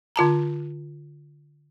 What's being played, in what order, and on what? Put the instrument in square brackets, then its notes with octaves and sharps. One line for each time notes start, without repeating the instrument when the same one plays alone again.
[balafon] D3 F4 A5 A#5